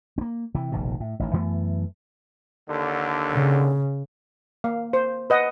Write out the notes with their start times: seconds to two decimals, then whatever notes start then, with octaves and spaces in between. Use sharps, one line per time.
0.18 A#3 C4
0.55 C3 E3
0.72 F1 A#1 B2 D#3
1.00 A2
1.20 A1 D#3
1.33 F#2 E3 A3 B3
2.68 D#2 D3
3.32 C#3
4.64 A#3 F5
4.93 C5
5.30 B4 D#5 F#5